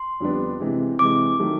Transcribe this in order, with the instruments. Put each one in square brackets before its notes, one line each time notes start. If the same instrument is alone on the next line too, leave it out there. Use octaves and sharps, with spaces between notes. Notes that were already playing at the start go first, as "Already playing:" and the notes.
Already playing: [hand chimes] C6
[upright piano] F2 D3 G3 B3 D4
C3 E3 G#3
[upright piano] C3 E3 G#3 [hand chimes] D6
[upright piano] D#3 F#3 A3